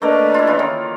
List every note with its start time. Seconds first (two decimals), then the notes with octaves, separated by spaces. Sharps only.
0.02 A3 A#3 D4 A#4 B4 D#5
0.34 E4 F4
0.47 C#3 E3 F4
0.59 D#3